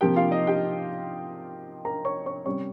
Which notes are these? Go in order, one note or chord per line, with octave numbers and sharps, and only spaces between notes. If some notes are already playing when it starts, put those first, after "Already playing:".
C3 F3 A#3 G4 G5
F4 F5
D#4 D#5
G4 G5
A#4 A#5
C#5 C#6
C#5 C#6
C3 G3 C#4 C#5 C#6